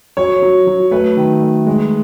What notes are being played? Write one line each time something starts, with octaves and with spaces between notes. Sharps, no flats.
F#3 C#5
F#3
F#3
A3 B4
D#3
A3
G#3